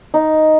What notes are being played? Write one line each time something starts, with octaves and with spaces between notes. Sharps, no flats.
D#4